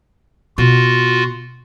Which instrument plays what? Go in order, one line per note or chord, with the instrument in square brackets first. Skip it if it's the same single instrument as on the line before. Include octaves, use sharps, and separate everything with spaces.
[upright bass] B2 [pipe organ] F4 F#4